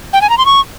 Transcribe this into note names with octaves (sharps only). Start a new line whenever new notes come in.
G5
G#5
A#5
C6
C#6